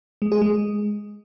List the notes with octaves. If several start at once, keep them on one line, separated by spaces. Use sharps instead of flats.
G#3
G#4
G#3